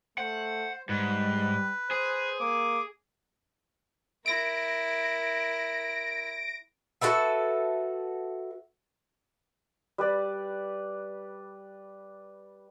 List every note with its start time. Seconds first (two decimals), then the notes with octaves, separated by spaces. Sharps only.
0.18 A3 C5 F#5
0.89 G#2 G3 B4
1.91 G#4 C5
2.40 A#3 D6
4.26 E4 A#4 A#6 D7
7.01 F#4 A4 B4 E5
9.98 G3 B4 D5